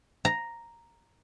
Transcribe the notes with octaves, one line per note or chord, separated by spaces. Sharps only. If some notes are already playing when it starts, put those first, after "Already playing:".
A#5